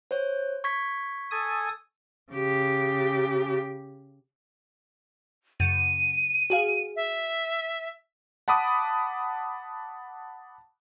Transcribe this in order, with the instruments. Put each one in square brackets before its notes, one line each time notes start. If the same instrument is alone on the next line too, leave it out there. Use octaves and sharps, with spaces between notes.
[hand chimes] C5 C#5
C#6 G#6 B6
[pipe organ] A4 G#5 D#6
[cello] C#3 G4
[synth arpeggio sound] F#2 C#3 C#7 [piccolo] D#7
[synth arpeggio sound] F#4 G#4 F5
[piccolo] E5
[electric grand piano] F#5 A5 B5 D6 D#6